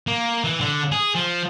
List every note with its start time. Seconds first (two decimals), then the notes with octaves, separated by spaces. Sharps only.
0.07 A#3
0.44 E3
0.61 D3
0.92 G#4
1.15 F3